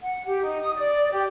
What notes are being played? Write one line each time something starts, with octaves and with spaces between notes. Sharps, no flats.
F#5
G4
D#4
D#6
D5
G4